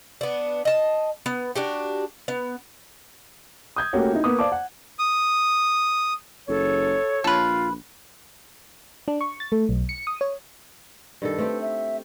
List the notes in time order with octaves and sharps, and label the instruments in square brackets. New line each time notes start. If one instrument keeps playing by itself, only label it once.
[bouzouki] B3 D4
D#5 A5
B3
D4 F#4 G4
B3
[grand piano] D#6 G6 G#6
A3 A#3 C#4 F#4 G4 C#5
D#4 E4
A#3 B3 D6 D#6
C5 D5 F5 A5 D6
F#5
[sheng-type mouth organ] D#6
[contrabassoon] F#1 [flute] A4 [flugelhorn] C#5
[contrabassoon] A#1 [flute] F4 [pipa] A4 B4
[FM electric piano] D4
C#6
A6
A3
B1
C#7
D#6
C#5
[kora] G2 D#3 A4
[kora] A3 C4 G4 [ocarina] B4
[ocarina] E5